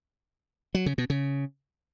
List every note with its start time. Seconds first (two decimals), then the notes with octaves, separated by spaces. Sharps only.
0.75 F#3
0.86 C#3
0.98 B2
1.10 C#3